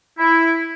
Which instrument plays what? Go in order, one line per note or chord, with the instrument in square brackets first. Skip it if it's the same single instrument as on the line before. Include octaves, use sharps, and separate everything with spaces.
[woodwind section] E4